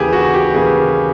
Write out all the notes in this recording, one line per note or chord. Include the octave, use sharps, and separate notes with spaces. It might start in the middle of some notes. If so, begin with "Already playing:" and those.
Already playing: D#2 C#3 E3 G4 G#4
F#4
G4
D#2 C#3 E3 G#4